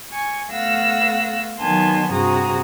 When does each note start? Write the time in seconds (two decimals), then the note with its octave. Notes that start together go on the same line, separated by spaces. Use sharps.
0.13 G#5 C#6
0.51 A3 B3 F5 F#5 E6 A#6
1.60 D#3 F#3 B3 G#5 A5 C6
2.11 G2 C3 F#4 G#4 A#5 D#6